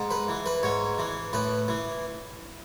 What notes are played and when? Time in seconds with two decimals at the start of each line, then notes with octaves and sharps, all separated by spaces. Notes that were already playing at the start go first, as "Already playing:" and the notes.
Already playing: G#2
0.11 B4
0.28 E3
0.46 B4
0.63 G#2 C#5
0.99 E3
1.33 A2 B4
1.68 E3